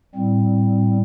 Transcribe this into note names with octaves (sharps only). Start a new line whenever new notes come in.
A2 G3 C4